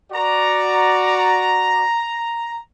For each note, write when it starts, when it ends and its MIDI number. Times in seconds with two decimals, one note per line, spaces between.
0.12 1.85 66
0.12 1.85 74
0.12 2.58 82